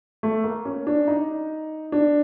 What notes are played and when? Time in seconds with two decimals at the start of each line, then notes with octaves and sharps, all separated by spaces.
0.23 A3
0.44 A#3
0.65 C#4
0.87 D4
1.08 D#4
1.92 D4